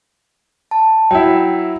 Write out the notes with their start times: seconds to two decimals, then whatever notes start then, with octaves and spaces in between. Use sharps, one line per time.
0.71 A5
1.11 F#3 E4 G5